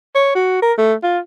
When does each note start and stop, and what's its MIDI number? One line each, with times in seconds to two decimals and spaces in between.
0.15 0.33 73
0.35 0.60 66
0.62 0.73 70
0.78 0.94 57
1.03 1.19 65